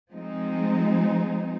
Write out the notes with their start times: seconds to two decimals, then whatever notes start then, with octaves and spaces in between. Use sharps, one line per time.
0.12 F3 G#3 C4 D#4